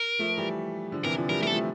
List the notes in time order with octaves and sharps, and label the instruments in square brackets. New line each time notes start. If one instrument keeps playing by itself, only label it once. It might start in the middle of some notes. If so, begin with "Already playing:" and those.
Already playing: [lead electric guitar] A#4
[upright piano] F3 A3
E3 G3
D3 F3
[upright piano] C3 E3 [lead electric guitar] A#4
[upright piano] D3 F3
[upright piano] E3 G3 [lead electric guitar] A#4
[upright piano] F3 A3 [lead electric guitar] A#4
[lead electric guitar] A4
[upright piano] F3 A3